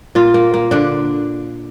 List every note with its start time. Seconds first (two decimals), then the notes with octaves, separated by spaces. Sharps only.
0.15 A#2 F4
0.34 A#3
0.54 A#3
0.71 D3 D4